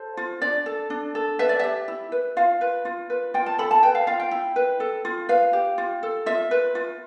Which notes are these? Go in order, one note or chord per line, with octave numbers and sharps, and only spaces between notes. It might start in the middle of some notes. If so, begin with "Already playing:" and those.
Already playing: A4 C5
F4
D4 D5
A4
D4
A4
B4 E5
D5
G4 E5
E4
B4
F4 F5
B4
F4
B4
F4 G5
A5
A4 B5
A5
B4 G5
F5
F4 F5
G5
E4
B4
A4
F4
B4 F5
G4
F4
A4
F4 E5
B4
F4